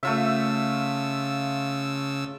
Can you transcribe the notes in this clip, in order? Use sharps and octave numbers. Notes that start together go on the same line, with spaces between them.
C#3 A3 F4 E5 E6